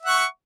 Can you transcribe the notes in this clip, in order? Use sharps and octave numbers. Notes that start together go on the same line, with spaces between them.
E5 F#5 C#6